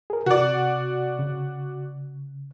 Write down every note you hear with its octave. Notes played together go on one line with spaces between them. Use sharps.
G#4 A#4
C3 F#4 D5
C#3